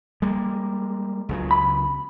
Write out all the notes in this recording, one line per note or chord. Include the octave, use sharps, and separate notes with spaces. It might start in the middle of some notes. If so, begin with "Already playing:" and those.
G3 G#3 A#3
C#2 C#3 F#3
B5